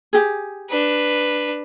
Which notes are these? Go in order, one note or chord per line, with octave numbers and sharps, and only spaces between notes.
G4 G#4
D4 B4